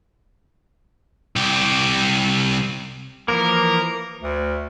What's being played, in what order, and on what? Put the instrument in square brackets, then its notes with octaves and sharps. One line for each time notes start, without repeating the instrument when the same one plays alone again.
[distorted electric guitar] C2 G4
[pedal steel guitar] E3 F3 A#3 [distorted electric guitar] A#4
[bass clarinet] D2